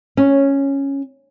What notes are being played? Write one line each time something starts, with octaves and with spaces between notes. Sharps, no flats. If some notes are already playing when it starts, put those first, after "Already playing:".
C#4